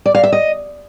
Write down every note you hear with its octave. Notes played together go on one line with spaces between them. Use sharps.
D5
F5
E5
D#5